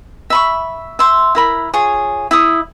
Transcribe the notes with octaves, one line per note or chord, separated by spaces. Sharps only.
E5 B5 C#6
E5 C6
E4 A#4 B5
F4 G#4 C#5
E4 D#6